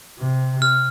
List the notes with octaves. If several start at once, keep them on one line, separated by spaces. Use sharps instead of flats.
C3
F6